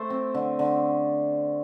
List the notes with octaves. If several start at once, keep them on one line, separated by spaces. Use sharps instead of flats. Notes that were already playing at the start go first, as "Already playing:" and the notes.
Already playing: A3 A4 C5
C4
D3
D3